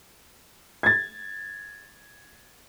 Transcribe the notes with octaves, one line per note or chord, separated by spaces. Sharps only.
G#6 A6